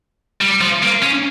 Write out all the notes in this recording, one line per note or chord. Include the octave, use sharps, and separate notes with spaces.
G3
F3
A#3
C#4